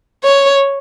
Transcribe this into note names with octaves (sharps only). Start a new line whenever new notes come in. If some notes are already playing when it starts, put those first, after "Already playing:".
C#5